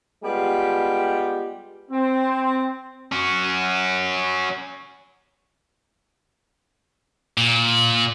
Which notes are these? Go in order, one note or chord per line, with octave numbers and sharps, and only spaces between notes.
G3 G#3 B3 F4 G4
C4
C#4 F#4
A#2